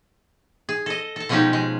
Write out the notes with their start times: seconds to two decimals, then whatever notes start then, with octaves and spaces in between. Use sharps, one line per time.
0.69 G#4
0.86 A4 D#5
1.16 A4 A5
1.29 B2 F3 G#3 C#4 D#4 G4
1.53 G#3